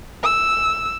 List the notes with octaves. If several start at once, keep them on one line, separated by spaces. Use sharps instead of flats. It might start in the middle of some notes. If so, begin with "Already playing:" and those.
E6